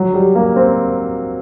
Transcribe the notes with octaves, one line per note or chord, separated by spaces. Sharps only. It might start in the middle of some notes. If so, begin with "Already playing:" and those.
Already playing: F#3
G3
A#3
C4